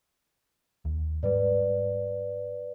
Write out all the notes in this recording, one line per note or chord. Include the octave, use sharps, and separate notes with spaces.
D#2
G#2 G3 B4 D5